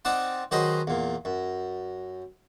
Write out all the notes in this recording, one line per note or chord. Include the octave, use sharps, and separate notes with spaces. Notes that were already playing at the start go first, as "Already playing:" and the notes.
C4 D#4 D5 F#5 A5
D#3 F#3 G#4 B4 C5 D#5
E2 A#2
F#2